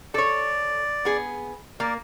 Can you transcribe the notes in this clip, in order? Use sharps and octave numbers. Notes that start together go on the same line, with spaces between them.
A4 C#5 D5
B3 G#4
A#3 A#4 D5